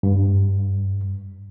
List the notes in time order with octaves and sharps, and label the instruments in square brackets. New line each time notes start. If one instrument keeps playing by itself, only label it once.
[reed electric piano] G2